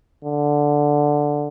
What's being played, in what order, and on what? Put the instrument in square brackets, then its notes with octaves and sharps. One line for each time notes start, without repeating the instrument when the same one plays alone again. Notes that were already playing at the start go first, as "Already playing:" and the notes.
[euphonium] D3